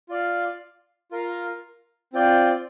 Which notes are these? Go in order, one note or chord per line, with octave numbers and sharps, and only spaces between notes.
F4 D5 F5
F4 A#4 F5
C4 F4 D5 G5